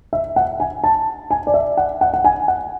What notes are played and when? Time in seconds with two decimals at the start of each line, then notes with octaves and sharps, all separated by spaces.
0.13 E5
0.36 F#5
0.60 G#5
0.84 A5
1.31 G#5
1.47 D5
1.54 E5
1.77 F#5
2.01 F#5
2.14 F#5
2.24 G#5
2.48 F#5